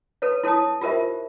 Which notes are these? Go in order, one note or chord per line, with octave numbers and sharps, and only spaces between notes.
A4 B4 C#5
E4 A4 C#5 A5 D#6
F4 G4 A#4 C5 E5